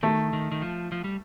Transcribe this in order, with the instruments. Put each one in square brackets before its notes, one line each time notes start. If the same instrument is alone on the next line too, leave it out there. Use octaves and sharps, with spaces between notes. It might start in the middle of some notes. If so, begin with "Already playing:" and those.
[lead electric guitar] D#3 [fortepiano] A3
[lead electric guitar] D#3
D#3
F3
F3
G3